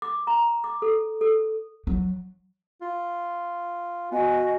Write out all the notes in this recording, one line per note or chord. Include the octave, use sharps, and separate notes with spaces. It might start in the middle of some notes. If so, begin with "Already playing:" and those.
D6
A#5
D6
A4
A4
F#3
F4
B3 F#4 D#5 G#5